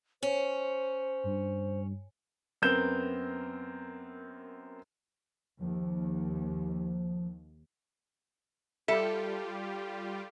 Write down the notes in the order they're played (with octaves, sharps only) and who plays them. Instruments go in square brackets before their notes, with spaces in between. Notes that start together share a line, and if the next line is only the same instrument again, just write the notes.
[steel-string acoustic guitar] C#4 [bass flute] C5
[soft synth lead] G2
[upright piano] F#2 B3 C4 A#4 G6 E7
[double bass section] D#2 [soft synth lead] F3
[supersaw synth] G3 F4 G4 [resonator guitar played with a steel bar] A4 [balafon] E5